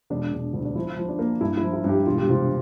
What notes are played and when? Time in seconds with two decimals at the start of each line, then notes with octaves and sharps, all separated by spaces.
0.10 E1 D4
0.32 E1
0.54 D2
0.65 D4
0.75 F3 E4
0.97 F3
1.09 D4
1.19 A#3
1.41 G2 E4
1.57 E4
1.63 F3
1.73 E4
1.84 G2
1.89 G4
2.06 E1 F4
2.18 G4
2.27 C3 F4